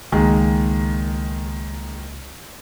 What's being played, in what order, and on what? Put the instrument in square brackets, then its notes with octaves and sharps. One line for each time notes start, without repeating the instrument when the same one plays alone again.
[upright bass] C#2 [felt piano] D#3 G#3 A#3